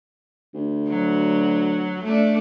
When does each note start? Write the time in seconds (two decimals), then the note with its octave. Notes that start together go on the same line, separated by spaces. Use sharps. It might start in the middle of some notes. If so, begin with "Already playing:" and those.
0.54 D2
0.88 F#3
2.03 A3 D4